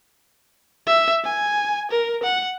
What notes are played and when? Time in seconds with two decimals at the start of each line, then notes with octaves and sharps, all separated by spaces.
0.87 E5
1.24 G#5
1.91 A#4
2.23 F#5